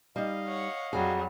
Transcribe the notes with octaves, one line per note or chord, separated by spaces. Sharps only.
G3 D#4 D#5 F5
C#5 F#5
F2 F#3 G3 F#4 G#4